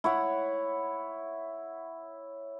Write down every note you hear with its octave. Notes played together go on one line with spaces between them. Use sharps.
E4 C#5 F#5